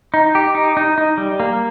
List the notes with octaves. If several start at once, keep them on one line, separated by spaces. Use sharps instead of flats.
D#4
G4
D#4
D#4
D#4
G3
A#3